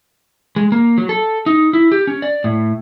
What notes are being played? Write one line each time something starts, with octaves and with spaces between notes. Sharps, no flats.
G#3
A#3
F#3
A4
D#4
E4
G4
C#4
D5
A2